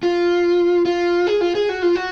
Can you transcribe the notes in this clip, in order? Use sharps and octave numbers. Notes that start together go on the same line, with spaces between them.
F4
F4
G#4
F4
G#4
F#4
F4
F#4